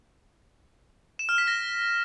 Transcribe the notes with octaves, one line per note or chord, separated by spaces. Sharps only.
E7
F6
B6
A#6